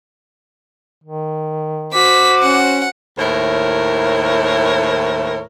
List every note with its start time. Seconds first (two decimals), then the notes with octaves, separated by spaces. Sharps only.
1.04 D#3
1.93 F#4 C5 D6 B6
2.42 C#4 F#5
3.19 D#2 A2 E4 A#4 C5 C#5